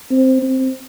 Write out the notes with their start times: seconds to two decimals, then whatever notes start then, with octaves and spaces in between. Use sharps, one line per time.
0.11 C4
0.43 C4